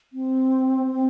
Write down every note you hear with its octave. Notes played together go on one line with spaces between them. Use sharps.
C4
C4